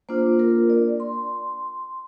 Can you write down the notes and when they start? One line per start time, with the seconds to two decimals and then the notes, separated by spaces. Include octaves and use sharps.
0.09 A#3 D4 F4 C5
0.39 A#4
0.70 D5
1.00 C6